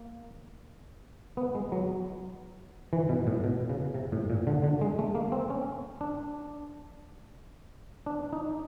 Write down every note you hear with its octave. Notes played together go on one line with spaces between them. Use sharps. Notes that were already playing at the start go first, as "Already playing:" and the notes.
Already playing: A#3
B3
G#3
F#3
E3
B2
A2
B2
C#3
C3
A2
A#2
D3
D3
G#3
A3
A#3
C4
C#4
D4
D4
D#4